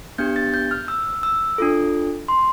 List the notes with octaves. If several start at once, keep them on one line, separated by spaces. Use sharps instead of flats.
B3 D4 G4 G6
A6
G6
F6
E6
E6
D4 F4 A4
C6